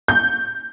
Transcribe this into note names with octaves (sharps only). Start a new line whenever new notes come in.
G6